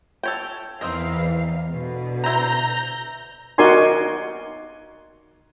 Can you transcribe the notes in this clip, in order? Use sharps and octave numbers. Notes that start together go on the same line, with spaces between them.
A4 C#5 G5
E2 E3 C4 D#4 A#4 F5
B2 D3
E4 C5 A#5 G6
D#4 F#4 A#4 D5 G#5 C6